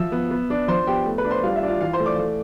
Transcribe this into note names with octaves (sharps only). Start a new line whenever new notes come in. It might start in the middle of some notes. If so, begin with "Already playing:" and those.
Already playing: F3 E5 E6
B3
B3
D4
F3 C5 C6
B3 G4 G5
A3
B4 B5
D4
C5 C6
G3 F4 F5
E5
D4
F4 F5
E3 F4 F5
C5 C6
A3
D5 D6
A3